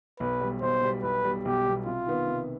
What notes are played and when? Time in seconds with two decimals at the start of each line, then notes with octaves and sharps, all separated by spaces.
0.20 B1 B4
0.41 B2 G3
0.62 B1 C5
0.82 B2 G3
1.03 B1 B4
1.24 B2 G3
1.45 B1 G4
1.65 B2 G3
1.86 C3 F4
2.07 D#3 B3
2.28 C3